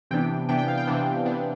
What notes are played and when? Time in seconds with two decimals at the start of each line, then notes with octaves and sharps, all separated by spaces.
0.11 C3 E3 B3 D4 G5
0.48 C3 E3 B3 D4 G5
0.59 G5
0.68 F5
0.77 G5
0.87 C3 E3 B3 D4
1.25 C3 E3 B3 D4